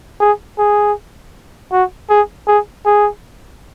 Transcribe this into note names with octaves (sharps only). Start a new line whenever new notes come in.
G#4
G#4
F#4
G#4
G#4
G#4